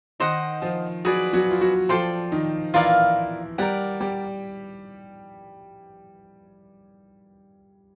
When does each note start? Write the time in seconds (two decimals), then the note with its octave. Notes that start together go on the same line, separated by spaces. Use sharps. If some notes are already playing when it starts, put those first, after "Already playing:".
0.20 D#3 D#4 C5 D#5 F#5
0.62 F3 F4
1.05 F#3 F#4 G#4 B4 D5
1.33 F#3 F#4
1.51 F4
1.61 F#3 F#4
1.89 F3 F4 A4 D5 G5 C6
2.32 D#3 D#4
2.74 E3 E4 F4 A#4 D5 F5
3.58 G3 G4 A#4 D5 F#5
4.00 G3 G4